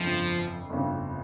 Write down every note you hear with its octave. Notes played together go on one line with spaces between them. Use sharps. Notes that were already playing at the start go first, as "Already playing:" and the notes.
Already playing: G1 F2 C#3 F3
G1 F2 C#3